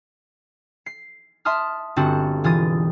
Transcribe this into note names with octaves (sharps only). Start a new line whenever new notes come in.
C7
E5 A5 C6 D#6 F6
G1 C4 F#4 A4 A5
E1 E3 F4 D#6 A6 D#7